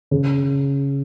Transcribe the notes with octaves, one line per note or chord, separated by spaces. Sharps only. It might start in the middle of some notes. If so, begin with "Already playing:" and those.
C#3